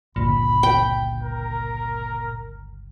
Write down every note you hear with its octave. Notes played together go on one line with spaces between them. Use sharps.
G1 C#2 A#2 B5
G5
A#4